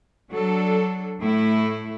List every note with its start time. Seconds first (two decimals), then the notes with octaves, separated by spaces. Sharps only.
0.31 F#3 D4 A4
1.19 A2 A3 E4